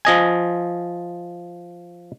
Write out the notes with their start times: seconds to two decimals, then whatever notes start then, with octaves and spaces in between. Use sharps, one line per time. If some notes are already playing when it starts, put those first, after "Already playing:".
0.05 F3 D#5 G#5